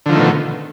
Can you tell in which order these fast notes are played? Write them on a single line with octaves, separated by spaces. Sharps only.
D3 F3 D#3 A3 B2